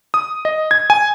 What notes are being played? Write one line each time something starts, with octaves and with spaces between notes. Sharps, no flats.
D#6
D#5
G#6
G#5